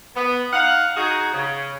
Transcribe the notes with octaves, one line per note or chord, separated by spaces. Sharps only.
B3
D#4 F5 F#5
D#4 F#4 G#4
C#3